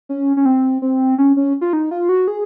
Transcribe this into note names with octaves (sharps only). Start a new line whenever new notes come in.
C#4
C#4
C4
C4
C#4
C#4
F4
D#4
F4
F#4
G#4